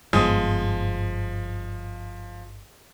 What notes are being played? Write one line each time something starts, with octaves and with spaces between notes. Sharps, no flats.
G1 G#2 F3 G#3 B3